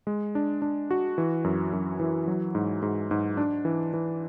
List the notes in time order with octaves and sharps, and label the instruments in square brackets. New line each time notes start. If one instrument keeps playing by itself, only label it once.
[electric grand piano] G#3
D4
D4
F#4
E3
F#2
F#2
E3
F#3
G#2
G#2
G#2
D4
E3
E3